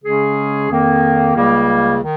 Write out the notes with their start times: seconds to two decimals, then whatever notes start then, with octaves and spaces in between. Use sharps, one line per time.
0.04 C#3 G#3 C#4 G#4
0.70 F2 D#3 A#3
1.34 C#2 C#3 G3 A#3
2.02 D#3